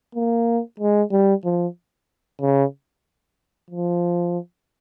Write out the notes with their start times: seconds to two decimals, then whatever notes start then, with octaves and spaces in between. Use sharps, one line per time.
0.15 A#3
0.80 G#3
1.11 G3
1.44 F3
2.41 C#3
3.70 F3